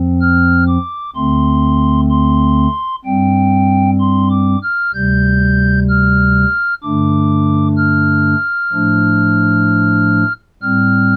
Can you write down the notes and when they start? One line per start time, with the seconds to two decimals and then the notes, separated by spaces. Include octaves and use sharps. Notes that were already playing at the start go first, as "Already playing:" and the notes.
Already playing: F2 F3 C4
0.21 F6
0.68 D6
1.15 D2 D3 A3 C4 C6
2.10 C6
3.05 G2 G3 C4 G5
4.00 C6
4.31 D6
4.63 F6
4.94 D2 C3 G3 G6
5.89 F6
6.83 G2 D3 A3 D4 D6
7.77 F6
8.72 A2 F3 A3 D4
10.62 A2 G3 C4 F6